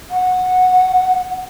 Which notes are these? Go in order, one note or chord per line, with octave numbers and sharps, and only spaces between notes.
F#5